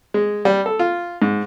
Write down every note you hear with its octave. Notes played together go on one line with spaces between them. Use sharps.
G#3
G3
A4
F4
G#2